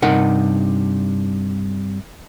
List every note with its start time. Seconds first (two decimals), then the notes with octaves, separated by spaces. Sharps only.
0.02 G2 C3 D#4 A#4 F#5 B5